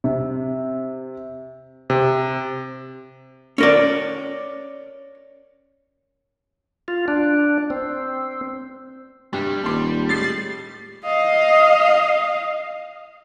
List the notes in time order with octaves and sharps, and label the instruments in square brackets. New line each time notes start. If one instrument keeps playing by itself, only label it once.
[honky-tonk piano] C3
[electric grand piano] C3
[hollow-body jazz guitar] C#4 A#4 D5
[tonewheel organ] F4
D4
C4
[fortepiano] G2 C3 [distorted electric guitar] G3
[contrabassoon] D#1 [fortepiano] A5 C6 D6
[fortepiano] A2 G#3 [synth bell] A6 C7
[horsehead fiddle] D#5 F5